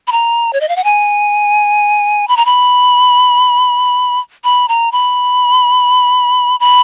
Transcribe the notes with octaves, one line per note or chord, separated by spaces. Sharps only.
B5
A#5
C#5
D#5
F5
F#5
G#5
B5
A#5
B5
B5
A#5
B5
B5